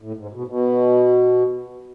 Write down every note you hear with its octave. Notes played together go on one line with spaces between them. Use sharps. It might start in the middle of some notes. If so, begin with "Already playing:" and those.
A2
G#2
B2
B2